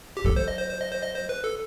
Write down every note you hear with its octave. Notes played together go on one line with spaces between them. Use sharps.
G4
F#3 A4
C5
D#5
C5
C5
D#5
C5
D#5
C5
B4
A4